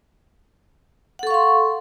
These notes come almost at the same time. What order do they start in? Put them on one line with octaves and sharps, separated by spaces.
F#5 A4 C#6 F5 C6